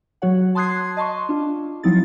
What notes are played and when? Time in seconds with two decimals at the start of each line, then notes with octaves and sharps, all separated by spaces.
0.22 F#3 F#4 C#5 F#5
0.55 A5 C6 D#6 F#6 G#6 C7
0.97 D#5 A5 C6 C#6
1.29 D4 F4
1.83 F3 F#3 C4 D#4 E4 A6